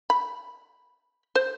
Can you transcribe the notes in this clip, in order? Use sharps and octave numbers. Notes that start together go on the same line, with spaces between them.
B5
C5